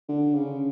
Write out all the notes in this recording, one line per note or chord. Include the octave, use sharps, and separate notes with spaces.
D3
C#3